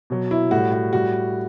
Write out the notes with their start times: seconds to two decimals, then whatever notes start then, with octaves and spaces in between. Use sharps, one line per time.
0.10 B2 F#3
0.31 E4
0.51 A2 G3 F#4
0.72 F#4
0.93 A2 G3 F#4